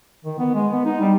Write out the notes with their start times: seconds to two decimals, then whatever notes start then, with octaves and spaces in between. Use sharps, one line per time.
0.25 D#3
0.39 B3
0.55 G#3
0.73 B3
0.86 D#4
1.01 G3